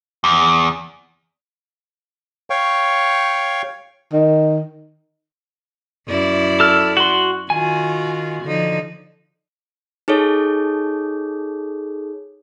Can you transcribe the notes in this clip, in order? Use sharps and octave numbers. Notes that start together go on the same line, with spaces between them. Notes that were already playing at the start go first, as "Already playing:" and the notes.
E2
C#5 F5 G5 C#6
D#3
F#2 E4 D5
A4 F6
F#4 C6
D#3 F4 F#4 G#5
D3 F3 D#4
D#4 G#4 A4 C#5